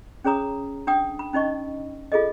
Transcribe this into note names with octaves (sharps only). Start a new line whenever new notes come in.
C#4 G#4 C#5 A#5 D#6
D4 G5 D#6
B5
C#4 D#4 D#5 C#6
F4 G#4 A4 D#5